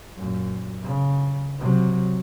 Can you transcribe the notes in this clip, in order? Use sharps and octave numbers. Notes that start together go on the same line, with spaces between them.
F#2 A#2
C#3
C3 F#3